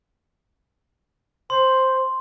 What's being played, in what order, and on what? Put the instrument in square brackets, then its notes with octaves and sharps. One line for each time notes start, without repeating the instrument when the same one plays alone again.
[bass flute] C5 [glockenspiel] C6